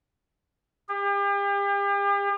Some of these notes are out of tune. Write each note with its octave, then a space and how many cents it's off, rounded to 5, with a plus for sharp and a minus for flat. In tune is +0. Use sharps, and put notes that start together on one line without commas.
G4 +40